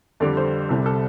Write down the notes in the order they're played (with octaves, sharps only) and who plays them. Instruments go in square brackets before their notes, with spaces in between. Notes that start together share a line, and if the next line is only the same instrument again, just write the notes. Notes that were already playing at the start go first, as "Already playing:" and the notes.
[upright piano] F2 D3 G3 D5
C5
C2 C3 G3 A4
A4